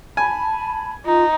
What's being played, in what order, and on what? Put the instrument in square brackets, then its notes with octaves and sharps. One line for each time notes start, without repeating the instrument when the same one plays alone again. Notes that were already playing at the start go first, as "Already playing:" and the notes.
[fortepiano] G#5 [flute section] A5 B5
[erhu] D#4 [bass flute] F4